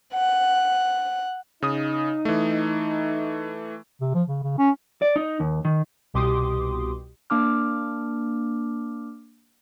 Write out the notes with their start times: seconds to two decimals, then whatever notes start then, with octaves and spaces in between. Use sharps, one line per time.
0.13 F#5
1.62 C#3 D#4 D#6
2.25 E3 A3
4.01 C3
4.15 F3
4.28 C#3
4.43 C#3
4.58 C#4
5.02 D5
5.16 D#4
5.40 D#2
5.65 D#3
6.14 C2 B2 G4 C6 D6 D#6
7.30 A#3 D4 D6 F6